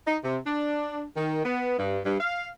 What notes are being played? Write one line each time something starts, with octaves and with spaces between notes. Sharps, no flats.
D#4
C3
D4
D#3
B3
G2
G2
F5